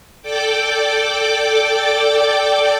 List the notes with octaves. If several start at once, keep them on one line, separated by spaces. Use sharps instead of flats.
A4 D5 G5 D6